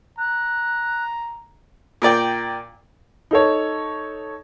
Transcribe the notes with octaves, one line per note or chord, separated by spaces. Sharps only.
A#5 F#6
A#2 A#4 D5 G5
D#4 A4 C#5